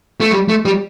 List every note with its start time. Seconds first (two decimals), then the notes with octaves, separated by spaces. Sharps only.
0.20 A3
0.32 G3
0.49 A3
0.65 G3